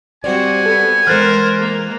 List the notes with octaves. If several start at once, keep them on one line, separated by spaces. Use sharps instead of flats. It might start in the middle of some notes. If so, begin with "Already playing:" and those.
G3 C4 F#4 C5 D5 G#5
B3 A4
E3 G#3 A#4 C5 F6 F#6 A6
A#3